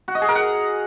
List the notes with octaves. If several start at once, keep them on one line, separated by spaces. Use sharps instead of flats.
F#4
D#5
G#4
A#4
F#5